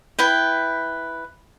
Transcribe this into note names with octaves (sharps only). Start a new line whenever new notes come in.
E4 B4 G5